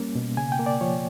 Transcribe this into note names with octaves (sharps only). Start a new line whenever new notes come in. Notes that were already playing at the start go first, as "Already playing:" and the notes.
Already playing: G3 A#3 C#4
B2
C#3 G#5
G5
A#3
D5
F3 C#5